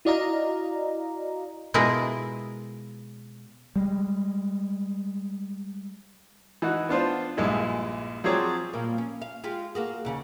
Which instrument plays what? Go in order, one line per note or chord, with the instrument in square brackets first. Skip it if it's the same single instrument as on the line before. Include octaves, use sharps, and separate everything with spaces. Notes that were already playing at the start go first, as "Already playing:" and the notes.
[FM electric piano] E4 F#4 D5 D#5 F5 A#5
[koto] B2 G#3 E4 F4 G#4 A#4
[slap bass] G3 G#3
[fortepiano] E3 D#4 F#4
B3 D4 F4 C5
A#1 G2 G#3 E4
F3 F#3 C4 G#4 C#5 D5
[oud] A#2 G3 A#3
C#4
F5
G#3 F4 G4
A#3 F#4 G#4
D#2 C#3 C#4